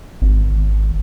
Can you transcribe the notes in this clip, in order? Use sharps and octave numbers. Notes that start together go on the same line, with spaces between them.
G#1